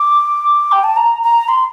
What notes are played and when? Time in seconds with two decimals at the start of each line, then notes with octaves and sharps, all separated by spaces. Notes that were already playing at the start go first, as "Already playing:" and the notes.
Already playing: D6
0.72 G5
0.84 A5
0.96 A#5
1.23 A#5
1.48 C6